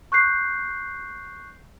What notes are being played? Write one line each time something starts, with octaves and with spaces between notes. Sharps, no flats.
C#6 F#6 G6 C7